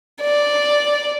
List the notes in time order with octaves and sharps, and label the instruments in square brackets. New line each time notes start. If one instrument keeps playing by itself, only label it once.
[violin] D5